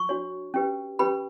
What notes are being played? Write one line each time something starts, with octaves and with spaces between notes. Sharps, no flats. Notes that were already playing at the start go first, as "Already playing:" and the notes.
Already playing: C#6
D4 F#4 C#5
C#4 G4 B4
C#4 G4 B4 B5